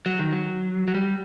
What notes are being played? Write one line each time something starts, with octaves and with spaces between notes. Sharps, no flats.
F#3
D#3
F#3
F#3
G3